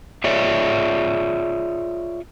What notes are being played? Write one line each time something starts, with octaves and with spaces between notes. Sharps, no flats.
F4 G#4 C#5 D5 E5